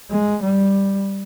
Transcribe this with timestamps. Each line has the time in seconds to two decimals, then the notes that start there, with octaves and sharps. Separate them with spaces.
0.11 G#3
0.42 G3